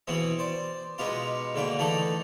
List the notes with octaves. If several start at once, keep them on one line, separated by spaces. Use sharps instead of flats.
B2 E3 B3 C4 G#4
C5 D5
B2 G#3 B3 D#4 F4 G4
G#2 D3 A#3 B4 G5
D3 E3 A3 D#4 A4 D5